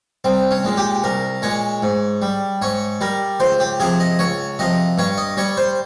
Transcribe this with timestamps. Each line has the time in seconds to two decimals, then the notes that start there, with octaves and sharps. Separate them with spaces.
0.24 C2 C4
0.51 C#4
0.64 A#2 G#3
0.77 G4
1.04 C2 A#4
1.42 A#2 G#3 C#5
1.83 G#2
2.22 G3
2.62 G#2 C#5
3.01 G3 A#4
3.40 C#2 C5
3.60 G4
3.80 C3 F3 G#4
4.00 D#5
4.19 C#2 C#5
4.59 C3 F3 D#5
4.98 G2 C#5
5.18 D#5
5.37 G3 C#5
5.57 C5